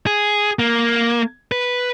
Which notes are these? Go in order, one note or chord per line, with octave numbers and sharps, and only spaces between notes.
G#4
A#3
B4